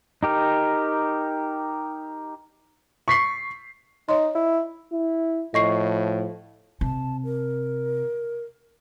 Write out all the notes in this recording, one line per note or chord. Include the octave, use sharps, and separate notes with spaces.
D#4 G4 A#4
C#6 B6 C7
D#4 C#5 D#5 C6
E4
E4
A2 F3 D#5 C#6 C7
C3 A5
A#4